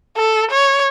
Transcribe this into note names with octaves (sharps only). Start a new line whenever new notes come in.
A4
C#5